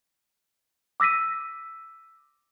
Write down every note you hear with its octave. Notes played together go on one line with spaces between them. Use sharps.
D6 E6 A#6 B6 D#7